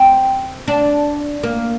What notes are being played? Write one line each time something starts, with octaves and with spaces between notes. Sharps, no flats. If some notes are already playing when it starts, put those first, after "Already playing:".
Already playing: C4
D4
A#3